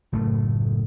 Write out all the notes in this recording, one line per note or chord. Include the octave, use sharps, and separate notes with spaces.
F#1 A2 A3